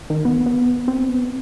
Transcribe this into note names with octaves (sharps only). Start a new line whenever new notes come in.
D#3
B3
B3
C4
B3